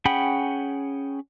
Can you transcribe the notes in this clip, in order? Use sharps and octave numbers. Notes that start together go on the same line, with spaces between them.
C#4 G#4 F#5 G5 B5